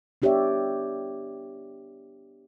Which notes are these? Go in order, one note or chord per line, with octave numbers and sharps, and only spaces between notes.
B3 D4 G4 C#5 D5 E5